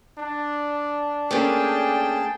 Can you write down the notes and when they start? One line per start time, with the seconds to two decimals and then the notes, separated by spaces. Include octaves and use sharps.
0.18 D4
1.31 A3 A#3 C#4 G#4 G5 A5